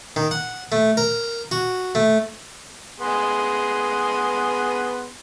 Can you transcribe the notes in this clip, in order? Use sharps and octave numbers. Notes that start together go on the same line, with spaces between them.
D#3
F#5
A3
A#4
F#4
A3
B3 G#4 C6